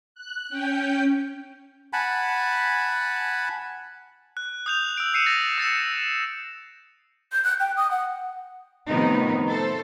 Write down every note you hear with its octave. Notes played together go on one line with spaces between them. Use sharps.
F#6
C#4 G5 G6
F#5 G#5 A5 B5
F#6
D#6 G6 F7
E6 D7
E6 C7 C#7 D#7 E7
A6 A#6
E6 A6 C#7 E7
G6
F#6
G5
D#6
F#5
A2 C3 D#3 F3 B3 D#4
A3 A4 C5